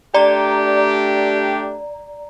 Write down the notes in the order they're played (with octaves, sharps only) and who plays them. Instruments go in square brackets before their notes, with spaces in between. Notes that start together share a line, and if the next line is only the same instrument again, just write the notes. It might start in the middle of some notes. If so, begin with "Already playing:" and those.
[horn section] A3 D4 G4 [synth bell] D5 A#5